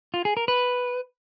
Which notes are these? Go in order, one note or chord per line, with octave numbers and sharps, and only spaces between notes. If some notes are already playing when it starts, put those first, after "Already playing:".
F4
G#4
A#4
B4